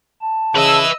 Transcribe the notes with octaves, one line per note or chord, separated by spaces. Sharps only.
A5
C#3 B4 D#5 E5 E6